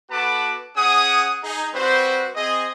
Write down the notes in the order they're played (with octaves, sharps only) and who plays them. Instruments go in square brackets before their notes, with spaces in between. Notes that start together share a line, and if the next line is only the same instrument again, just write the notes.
[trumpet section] B3 F#4 A4 B4 A5 D6
C#4 G#4 F#5 D#6
D#4 G#4
G3 C4 F#4 B4 C5
C4 G#4 D#5